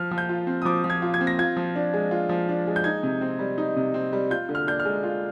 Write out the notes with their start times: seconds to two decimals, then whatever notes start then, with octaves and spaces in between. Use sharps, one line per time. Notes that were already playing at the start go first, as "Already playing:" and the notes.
Already playing: F3 F6
0.11 F3
0.18 G6
0.29 F4
0.47 C4
0.62 D#6
0.65 F3 D6
0.84 F3
0.90 G#6
1.02 F4
1.14 G#6
1.21 C4
1.27 A#6
1.39 F4 G#6
1.57 F3
1.76 D4
1.94 G#3
2.11 F4
2.29 F3
2.49 D4
2.67 G#3
2.76 G6
2.84 D#4 G#6
3.03 C3
3.21 C4
3.39 G3
3.58 D#4
3.76 C3
3.94 C4
4.13 G3
4.30 F4 G6
4.49 D3
4.55 F6
4.67 D4 G6
4.80 F6
4.85 G#3
5.04 F4